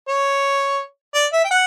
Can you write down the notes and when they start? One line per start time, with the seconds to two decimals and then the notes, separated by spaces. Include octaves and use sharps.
0.08 C#5
1.14 D5
1.33 E5
1.44 G5
1.51 F#5